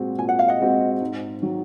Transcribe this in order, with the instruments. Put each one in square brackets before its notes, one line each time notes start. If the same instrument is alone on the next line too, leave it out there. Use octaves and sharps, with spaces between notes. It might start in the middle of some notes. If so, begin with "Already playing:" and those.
Already playing: [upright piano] A#2 G#3 C4 F#4
[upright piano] A#2 [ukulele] G#5
[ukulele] F#5
F5
D#5 F#5
[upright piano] G#3 C4 F#4
G#2
D#3 F#3